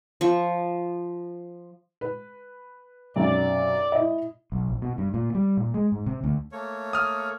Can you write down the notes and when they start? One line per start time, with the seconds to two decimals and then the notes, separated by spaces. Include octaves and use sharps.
0.21 F3 C#6
2.01 B4
3.16 B1 F#2 C3 D5
3.92 E4 D#5
4.52 B1
4.69 A#1
4.82 B2
4.98 G2
5.14 A#2
5.35 G3
5.57 A#2
5.74 G#3
5.92 G#2
6.06 C3
6.24 D2
6.52 A3 A#3 C#5
6.93 D#6 F6